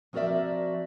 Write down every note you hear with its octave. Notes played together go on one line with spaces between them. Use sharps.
F3 C4 F#4 A#4 D5 E5